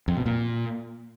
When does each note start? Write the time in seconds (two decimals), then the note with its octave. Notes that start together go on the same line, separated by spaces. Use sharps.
0.08 F2
0.17 B2
0.26 A#2